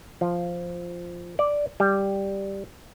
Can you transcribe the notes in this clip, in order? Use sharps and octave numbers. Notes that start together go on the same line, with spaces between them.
F3
D5
G3